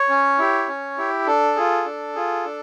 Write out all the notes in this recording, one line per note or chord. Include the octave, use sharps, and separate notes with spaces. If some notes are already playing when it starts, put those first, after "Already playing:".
Already playing: C#5
C#4
E4 G4
C#4
E4 G4
D4 A4
F4 G#4
D4
F4 G#4
D4